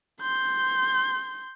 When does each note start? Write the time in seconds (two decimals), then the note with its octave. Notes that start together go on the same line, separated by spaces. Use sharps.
0.21 C6 G6